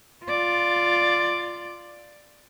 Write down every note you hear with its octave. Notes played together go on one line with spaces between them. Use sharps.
F4 D5